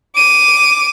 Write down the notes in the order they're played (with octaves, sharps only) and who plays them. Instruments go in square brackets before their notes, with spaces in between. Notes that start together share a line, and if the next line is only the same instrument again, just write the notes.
[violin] D6 D#7